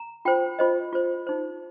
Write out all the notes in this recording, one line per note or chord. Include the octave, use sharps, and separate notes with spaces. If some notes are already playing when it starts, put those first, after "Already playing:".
Already playing: A#5
F4 C5 G5
F4 C5 D#5
F4 C5
D#4 C5